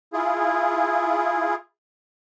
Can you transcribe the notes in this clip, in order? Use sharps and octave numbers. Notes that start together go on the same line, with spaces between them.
E4 F4 G#4